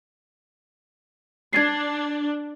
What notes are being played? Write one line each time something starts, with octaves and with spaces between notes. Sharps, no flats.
D4 G#6 A6 C7